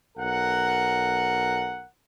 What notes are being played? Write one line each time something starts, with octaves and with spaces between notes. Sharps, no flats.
B1 A#4 F#5